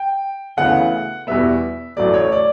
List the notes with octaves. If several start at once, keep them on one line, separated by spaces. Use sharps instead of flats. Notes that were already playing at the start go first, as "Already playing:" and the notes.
Already playing: G5
D2 C#3 E3 B3 F#5
E2 B2 G3 B3 E5
A1 A2 F#3 A3 D5
C#5
D5